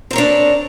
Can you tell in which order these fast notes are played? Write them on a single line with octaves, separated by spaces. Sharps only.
C4 A#4 C#5 D4